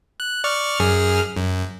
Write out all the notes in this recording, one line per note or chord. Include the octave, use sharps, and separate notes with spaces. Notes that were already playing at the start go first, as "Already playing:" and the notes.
F#6
D5 C#6 F6
F#2 G#4 F6
F#2